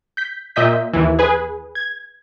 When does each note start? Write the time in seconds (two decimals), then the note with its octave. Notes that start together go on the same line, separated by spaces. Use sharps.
0.17 G6 B6
0.56 A#2 D#5 E5 G6 B6
0.93 D#2 E3
1.19 G#4 B4 G#5
1.75 G#6